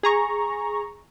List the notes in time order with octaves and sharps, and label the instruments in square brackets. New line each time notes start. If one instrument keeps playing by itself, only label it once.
[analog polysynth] G#4 A#5 C#6